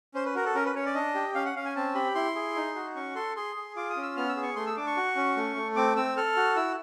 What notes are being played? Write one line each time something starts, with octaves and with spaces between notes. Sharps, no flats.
C#4 C5
B4
F#4 A#4
A4
C#4 A#4
B4
C#4 C#5
D5
D4 D#5
G4
C#4 F5
F#5
C#4 F5
G#5
C4 A5
G4 B5
E4 C6
G#4
D#4
F#4
C#4 C#6
A4 C6
G#4 C6
G#4
F4 D6
D#6
C#4
E6
B3 F6
E6
G#4
C#6
A3 C6
E6
D4 D6
C#6
F#4
C#4
A3
A3
C4 D6
C4 E6
A4 F6
F#4
E4 E6